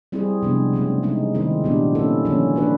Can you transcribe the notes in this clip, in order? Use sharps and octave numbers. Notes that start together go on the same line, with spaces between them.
G3 C4 E4 G#4
C3 F3 G#3 B3 D4
C#3 F#3 A3 C4
G#3 C4 D#4
D#3 G#3 C4 E4
A#2 F#3 B3 D4 G4
A#3 C#4 E4 A4
D3 F3 A#3 C#4
A#3 D4 F#4 B4 D5